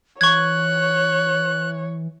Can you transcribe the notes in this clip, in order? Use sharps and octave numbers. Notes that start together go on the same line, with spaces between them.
E3 C#5 C#6 F#6 G#6